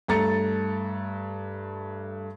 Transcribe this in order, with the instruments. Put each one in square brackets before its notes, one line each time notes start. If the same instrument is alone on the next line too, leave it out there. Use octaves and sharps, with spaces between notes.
[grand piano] G2 A3 A#5 A6 C#7